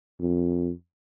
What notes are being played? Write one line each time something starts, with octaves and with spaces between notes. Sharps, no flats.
F2